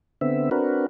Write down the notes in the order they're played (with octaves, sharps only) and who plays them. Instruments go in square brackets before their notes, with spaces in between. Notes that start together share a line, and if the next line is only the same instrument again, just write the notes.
[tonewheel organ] D3 B3 C4 E5
C4 D4 F#4 A#4 B4